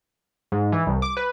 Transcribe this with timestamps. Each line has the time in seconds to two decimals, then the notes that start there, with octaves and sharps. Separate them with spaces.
0.52 G#2
0.72 E3
0.87 C2
1.02 D6
1.17 B4